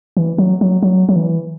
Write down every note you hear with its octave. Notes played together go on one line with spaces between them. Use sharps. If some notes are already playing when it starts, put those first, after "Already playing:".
E3
F#3
F#3
F#3
F#3
E3